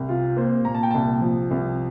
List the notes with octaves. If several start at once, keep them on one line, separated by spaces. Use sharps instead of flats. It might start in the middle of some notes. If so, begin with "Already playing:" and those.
Already playing: C2
C3 F4
A#3 C5
A#2 A#5
A5
G5
C2 A5
F3
C2